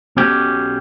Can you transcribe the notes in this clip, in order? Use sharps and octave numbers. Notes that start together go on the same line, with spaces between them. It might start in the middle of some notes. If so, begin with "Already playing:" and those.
B1 B2 C#4 G4